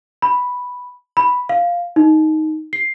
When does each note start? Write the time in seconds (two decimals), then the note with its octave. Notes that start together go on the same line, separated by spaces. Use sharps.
0.22 B5
1.17 B5
1.49 F5
1.96 D#4
2.73 C7